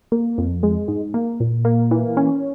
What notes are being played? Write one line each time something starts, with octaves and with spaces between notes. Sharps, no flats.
A#3
F2
G#3
G#2
A#3
A#2
A#3
E3
C#4